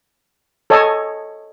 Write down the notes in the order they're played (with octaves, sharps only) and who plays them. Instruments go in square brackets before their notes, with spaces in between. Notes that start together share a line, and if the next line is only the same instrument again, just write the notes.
[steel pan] A4 C#5 D#5 G#5